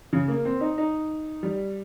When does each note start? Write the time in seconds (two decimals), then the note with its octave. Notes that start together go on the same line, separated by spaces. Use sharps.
0.13 C#3
0.28 A#3
0.45 C4
0.61 D#4
0.78 D#4
1.43 G3